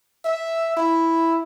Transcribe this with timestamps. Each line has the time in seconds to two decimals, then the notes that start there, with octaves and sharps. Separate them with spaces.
0.25 E5
0.77 E4